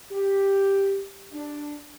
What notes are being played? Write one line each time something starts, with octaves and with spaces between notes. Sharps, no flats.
G4
D4